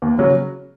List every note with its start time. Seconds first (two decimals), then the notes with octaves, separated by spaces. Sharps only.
0.02 D#2
0.18 C#3 F#3 C#4 F#4